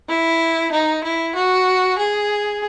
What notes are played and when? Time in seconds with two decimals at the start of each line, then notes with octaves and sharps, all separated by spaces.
0.09 E4
0.72 D#4
1.04 E4
1.35 F#4
1.98 G#4